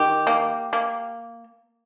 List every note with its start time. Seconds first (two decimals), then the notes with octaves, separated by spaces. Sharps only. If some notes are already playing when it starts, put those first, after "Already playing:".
Already playing: D#3 G4
0.27 A#3
0.73 A#3